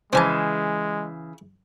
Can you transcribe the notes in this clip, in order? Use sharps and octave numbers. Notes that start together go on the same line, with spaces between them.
C#3 E3 G#3 C4 G#5 A5